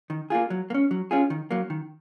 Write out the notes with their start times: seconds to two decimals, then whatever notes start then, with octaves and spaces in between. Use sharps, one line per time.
0.10 D#3
0.30 A#3 F4 G#4
0.50 F#3
0.70 A#3
0.74 C#4
0.91 F#3
1.11 C#4 F4 G#4
1.30 D#3
1.51 F#3 A#3
1.70 D#3